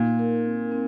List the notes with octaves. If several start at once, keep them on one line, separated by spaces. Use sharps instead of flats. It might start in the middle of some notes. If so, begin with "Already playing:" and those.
Already playing: A#2 D#4
A#4
C4
C4